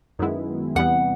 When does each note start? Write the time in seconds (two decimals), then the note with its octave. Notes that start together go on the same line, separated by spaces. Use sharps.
0.19 F#2 D#3 G#3 B3 E4
0.75 E2 C3 E3 G3 B3 F#5